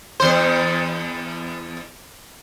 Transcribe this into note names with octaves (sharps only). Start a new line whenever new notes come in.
E2 C5